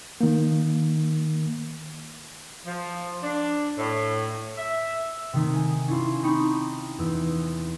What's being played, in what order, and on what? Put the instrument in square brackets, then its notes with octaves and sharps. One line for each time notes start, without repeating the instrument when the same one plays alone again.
[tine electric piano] D#3 A#3
[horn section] F3
D4
A2
E5
[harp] C3 D#3 A3
G#5
C#4 D4 E4 F4
C4 D#4 A5 B5 C#6 C#7
E2 E6